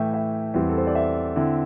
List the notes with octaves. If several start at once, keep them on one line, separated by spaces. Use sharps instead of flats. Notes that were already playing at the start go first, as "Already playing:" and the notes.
Already playing: A2 E3 A3 E4 E5 G5
E5
E2 E3 G3 C4 E4
A4
C5
D5
E5
D3 C4 E4